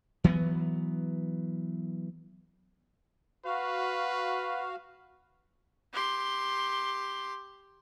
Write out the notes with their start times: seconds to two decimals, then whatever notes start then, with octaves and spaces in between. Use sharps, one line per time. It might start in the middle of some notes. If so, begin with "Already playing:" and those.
0.24 E3 F#3 A#3 B3
3.45 F#4 B4 F5
5.93 G4 C6